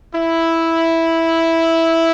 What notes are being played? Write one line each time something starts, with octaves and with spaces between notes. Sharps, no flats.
E4